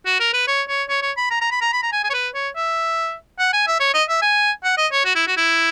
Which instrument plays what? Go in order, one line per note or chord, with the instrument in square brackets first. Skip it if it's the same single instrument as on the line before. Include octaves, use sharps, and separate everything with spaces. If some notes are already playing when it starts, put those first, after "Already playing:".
[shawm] F#4
A#4
B4
C#5
C#5
C#5
C#5
B5
A#5
A#5
B5
A#5
B5
A#5
G#5
G#5
C#5
B4
C#5
E5
F#5
G#5
E5
C#5
D#5
E5
G#5
F#5
D#5
C#5
F#4
E4
F#4
E4